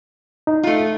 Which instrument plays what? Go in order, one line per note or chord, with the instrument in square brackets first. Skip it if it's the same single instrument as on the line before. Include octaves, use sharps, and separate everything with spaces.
[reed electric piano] D#4
[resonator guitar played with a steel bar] A3 F4